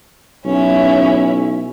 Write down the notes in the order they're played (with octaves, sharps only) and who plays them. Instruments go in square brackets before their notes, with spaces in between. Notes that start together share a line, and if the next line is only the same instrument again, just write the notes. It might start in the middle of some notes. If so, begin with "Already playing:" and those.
[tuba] B1 [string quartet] C#4 E4